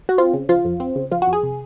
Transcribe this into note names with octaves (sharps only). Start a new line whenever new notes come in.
F#4
C4 F4
C#3
F3 F4
F2
C4
C#3
F3 F4
F#4
F2
G#4
C3